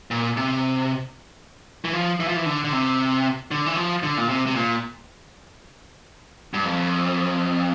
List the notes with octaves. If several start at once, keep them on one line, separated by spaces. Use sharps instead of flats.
A#2
C3
E3
F3
E3
F3
E3
D3
D3
C3
D3
E3
F3
D3
A#2
C3
C3
A#2
G2
F2